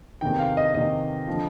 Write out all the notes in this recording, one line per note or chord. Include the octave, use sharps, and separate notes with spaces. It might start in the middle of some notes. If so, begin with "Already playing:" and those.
E2 C3 D#3 G5
F5
D#5
E2 C3 D#3 D#5
D3 F3